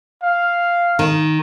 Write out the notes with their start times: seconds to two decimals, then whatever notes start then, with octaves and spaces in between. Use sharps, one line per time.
0.23 F5
0.99 D#3